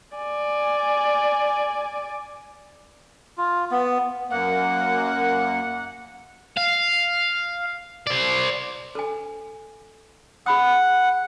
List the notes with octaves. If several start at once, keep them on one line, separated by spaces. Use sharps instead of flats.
D5 G#5
F4
B3
F#2 A#3 F#5
F5
C5 D5
A4 G#5
G#4 F#5 B5 D#6